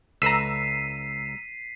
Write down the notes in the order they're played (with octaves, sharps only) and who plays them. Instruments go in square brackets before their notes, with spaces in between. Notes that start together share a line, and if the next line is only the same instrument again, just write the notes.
[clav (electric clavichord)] C#2 A4 B4 [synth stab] A#5 E6 [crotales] B6 C7 D#7